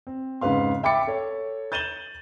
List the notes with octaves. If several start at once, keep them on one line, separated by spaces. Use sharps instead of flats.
C4
F2 G#2 C#3 B4 F5 C6
E5 G5 B5 D6 A6 C#7
A4 C#5
G6 A6 D#7 E7 F#7 G7